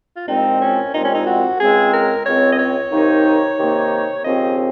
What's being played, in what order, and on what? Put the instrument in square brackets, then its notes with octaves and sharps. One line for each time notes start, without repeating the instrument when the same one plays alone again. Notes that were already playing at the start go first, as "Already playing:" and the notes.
[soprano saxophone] F4
[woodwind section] C2 A#2 F3 G#3 C4 [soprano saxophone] D#4
[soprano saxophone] C#4
[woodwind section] C2 A#2 F3 G#3 C4 [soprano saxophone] D#4
[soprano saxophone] C#4
D#4
F#4
[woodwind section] C#2 C#3 G#3 C4 [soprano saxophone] G#4
[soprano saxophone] A#4
[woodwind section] C#2 C#3 G#3 C4 [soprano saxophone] C#5
[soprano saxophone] D#5
C#5
[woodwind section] C3 D#3 A#3 D#4
C3 D#3 A#3 D#4
[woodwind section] D#2 C#3 F3 C4 [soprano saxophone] D#5